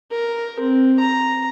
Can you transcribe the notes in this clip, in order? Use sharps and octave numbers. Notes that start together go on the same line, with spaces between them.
A#4
C4
A#5